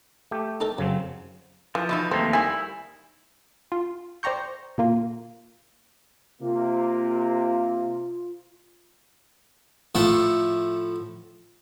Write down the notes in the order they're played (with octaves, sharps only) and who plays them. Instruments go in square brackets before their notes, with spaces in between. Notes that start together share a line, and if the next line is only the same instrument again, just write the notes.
[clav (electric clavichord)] A3 G4
[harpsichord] D#4 A4 A#4
[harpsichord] F#2 [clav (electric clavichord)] C#3 F#3 C4
[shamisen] E3 [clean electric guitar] F3
[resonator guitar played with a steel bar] E2 B2 D#4 [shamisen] E5
[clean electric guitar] D#2 A3 A#3 [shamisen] C4
[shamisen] D#3 G#5 [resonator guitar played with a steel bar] G3 [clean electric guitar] E4
[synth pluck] F4
C5 D5 G5 A#5 C#6 G6
A#2 A#3 F4
[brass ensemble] C3 A#3 [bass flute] F4
[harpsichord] A2 F3 A3 A4 F#5